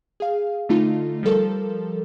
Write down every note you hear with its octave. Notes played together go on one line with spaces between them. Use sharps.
G#4 F5
D3 A3 D#4 F4
F3 G3 A4 A#4